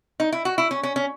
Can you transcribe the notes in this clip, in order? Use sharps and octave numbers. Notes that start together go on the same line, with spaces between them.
D#4
E4
F#4
E4
C#4
C#4
C#4